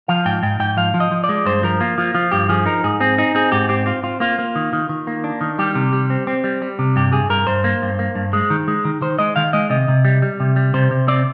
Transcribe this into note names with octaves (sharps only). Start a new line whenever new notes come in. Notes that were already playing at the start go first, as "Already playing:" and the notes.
F3 F5
G#2 G5
G#2 G5
G#2 G5
F3 F5
F3
D#5
F3
D5
G#3
G2 C5
F3 A#4
A#3 F4
F3 F4
F3 F4
G2 G4
F3 G#4
D#4 A#4
G#2 G#4
C4 G#4
D#4 G#4
C4 G#4
G#2 G4
C4 G4
C4 F4
C4 F4
A#3 F4
A#3
D#3
D#3
D#3
A#3
D4
D#3
G3 G4
C3
G3
C4
C4
G3
G3
C3
G2 G4
G2 G#4
G2 A#4
G2 C5
A#3
G2
A#3
G2
G#3
D#3
G#3
D#3
D#3 C5
G#3 D#5
D#3 F5
G#3 D#5
C3 D#5
C3
G3
G3
C3
G3
C3 C5
C3
C4 D5